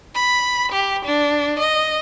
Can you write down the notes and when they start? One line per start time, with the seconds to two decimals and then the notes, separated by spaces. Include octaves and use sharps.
0.14 B5
0.72 G4
1.05 D4
1.59 D#5